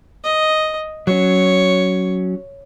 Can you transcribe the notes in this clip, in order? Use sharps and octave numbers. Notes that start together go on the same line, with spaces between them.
D#5
F#3 C#4 C#5